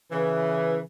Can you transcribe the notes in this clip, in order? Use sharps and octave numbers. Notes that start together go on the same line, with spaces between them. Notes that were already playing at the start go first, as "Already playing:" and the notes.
C#3 E3 B4